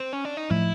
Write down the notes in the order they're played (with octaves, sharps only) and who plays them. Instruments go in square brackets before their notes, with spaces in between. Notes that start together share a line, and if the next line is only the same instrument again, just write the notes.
[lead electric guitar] C4
C#4
D4
D#4
[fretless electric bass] A2 F3 A3 [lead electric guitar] E4